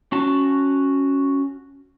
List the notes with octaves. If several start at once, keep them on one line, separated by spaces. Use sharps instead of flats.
C#4 F#4 A5